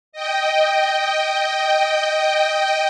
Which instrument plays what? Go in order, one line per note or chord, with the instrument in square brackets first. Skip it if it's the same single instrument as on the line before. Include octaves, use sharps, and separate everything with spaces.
[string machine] D#5 G5